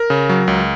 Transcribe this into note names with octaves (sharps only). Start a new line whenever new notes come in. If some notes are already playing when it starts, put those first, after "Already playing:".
Already playing: A#4
C#3
F#3
C#2